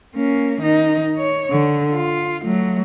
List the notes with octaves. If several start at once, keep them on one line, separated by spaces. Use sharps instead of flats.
A#3 C#4
D#3 D#4
C#5
D3
F4
F#3 A3